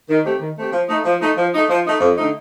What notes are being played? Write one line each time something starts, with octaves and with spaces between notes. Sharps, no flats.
D#3
A3 C4 G4
D#3
A3 C4 G4
F3
A3 D#4
F3
A3 D#4
F3
A3 D#4
F3
A3 D#4
F2
D3 A3 D#4